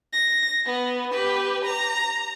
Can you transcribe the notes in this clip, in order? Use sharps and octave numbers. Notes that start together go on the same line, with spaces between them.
A#6
B3
G4 B4
A#5